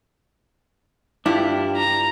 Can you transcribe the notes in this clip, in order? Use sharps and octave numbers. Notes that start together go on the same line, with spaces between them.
G2 D4 E4 F4 G4
A#5